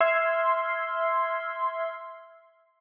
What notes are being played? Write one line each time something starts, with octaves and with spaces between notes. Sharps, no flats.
E5 C6 E6 F6 G#6 C7